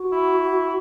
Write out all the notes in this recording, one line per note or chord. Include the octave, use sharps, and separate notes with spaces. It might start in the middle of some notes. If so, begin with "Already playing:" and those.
Already playing: F#4
E4